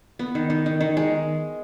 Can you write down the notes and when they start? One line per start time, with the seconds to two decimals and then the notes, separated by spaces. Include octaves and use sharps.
0.19 B3
0.35 D#3
0.50 D#3
0.66 D#3
0.81 D#3
0.97 G#3